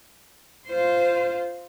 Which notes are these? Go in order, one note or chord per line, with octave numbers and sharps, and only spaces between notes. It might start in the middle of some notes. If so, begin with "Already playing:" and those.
F4 C5